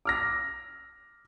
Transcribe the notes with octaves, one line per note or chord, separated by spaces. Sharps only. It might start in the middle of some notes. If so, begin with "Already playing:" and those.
D6 F6 A#6